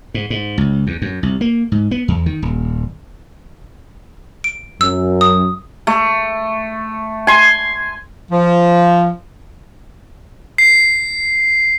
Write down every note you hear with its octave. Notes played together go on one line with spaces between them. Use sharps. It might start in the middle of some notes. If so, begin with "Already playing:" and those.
G#2
G#2
C#2
E2
F#2
C2
A#3
G#2
B3
E2
D#3
D#1
D7
F#2 E6
D#6
A3
G#5 C6
F3
C7